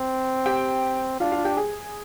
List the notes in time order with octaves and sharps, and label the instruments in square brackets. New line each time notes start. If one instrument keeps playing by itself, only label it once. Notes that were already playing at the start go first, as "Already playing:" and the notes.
Already playing: [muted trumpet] C4
[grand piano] G4 G5
[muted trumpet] D4 [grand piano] F4 F5
[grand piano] F4 F5
G4 G5
G#4 G#5